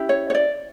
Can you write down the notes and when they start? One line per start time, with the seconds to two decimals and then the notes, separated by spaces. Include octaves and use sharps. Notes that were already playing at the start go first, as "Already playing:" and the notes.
Already playing: C#4 E4 G4
0.09 C#5
0.30 C#5
0.35 D5